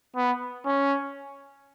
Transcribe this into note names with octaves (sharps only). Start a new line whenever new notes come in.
B3
C#4